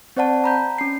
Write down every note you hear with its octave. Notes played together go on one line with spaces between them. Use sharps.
C4 C5 D5 F#5 A5
A#5 B5 G6
C#4 C7